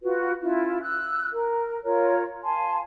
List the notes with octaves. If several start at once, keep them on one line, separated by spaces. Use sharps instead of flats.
F4 F#4 B4
C#4 E4 F4
E6 F#6
A#4
F4 A#4 C#5
F5 G#5 A5 C6